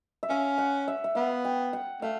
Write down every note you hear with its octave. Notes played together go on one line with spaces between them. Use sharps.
E5
C#4 F5
F#5
E5
E5
B3 F5
G5
F#5
A3 F5